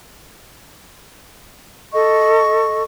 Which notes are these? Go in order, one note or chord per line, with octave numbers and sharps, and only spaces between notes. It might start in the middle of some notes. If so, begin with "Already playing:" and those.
A4 D#5 C#6